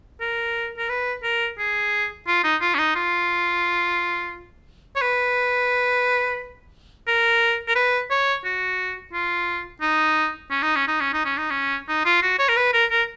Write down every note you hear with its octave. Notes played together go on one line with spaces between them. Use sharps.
A#4
A#4
B4
A#4
G#4
F4
D#4
F4
C#4
D#4
F4
C#5
B4
A#4
A#4
B4
C#5
F#4
F4
D#4
C#4
D#4
C#4
D#4
C#4
D#4
C#4
D#4
C#4
D#4
F4
F#4
C#5
A#4
B4
A#4
A#4